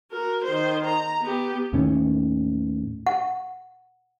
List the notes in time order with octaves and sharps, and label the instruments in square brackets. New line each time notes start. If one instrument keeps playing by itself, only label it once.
[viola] F#4 A#4
D#3 C5
A#5
B3 G4
[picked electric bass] D#2 A2 D#3 C#4
[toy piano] F#5